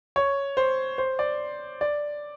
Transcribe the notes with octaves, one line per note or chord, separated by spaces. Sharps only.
C#5
C5
C5
D5
D5